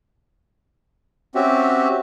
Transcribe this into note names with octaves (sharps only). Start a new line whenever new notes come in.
C4 C#4 F#4 G4 E5